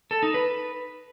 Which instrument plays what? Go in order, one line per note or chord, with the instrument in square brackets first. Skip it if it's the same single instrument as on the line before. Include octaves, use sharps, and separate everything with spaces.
[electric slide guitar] A4
D#4
B4